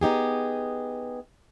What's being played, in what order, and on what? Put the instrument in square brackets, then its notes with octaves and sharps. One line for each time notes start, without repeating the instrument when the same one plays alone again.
[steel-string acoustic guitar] B3 D#4 G4 G#4